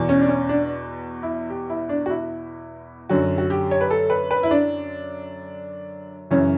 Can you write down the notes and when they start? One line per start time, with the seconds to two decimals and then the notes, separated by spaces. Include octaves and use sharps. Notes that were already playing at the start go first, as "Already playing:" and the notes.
Already playing: E2 B2
0.09 C#4
0.21 D4
0.29 C#4
0.49 D4
1.23 E4
1.50 G4
1.70 E4
1.89 D4
2.06 F#4
2.10 E4
3.09 F#2 D3 F#4
3.38 F#4
3.50 G4
3.71 C#5
3.81 B4
3.91 A4
4.10 B4
4.31 B4
4.43 E4
4.51 D4
6.30 F#2 C#3 E3 C#4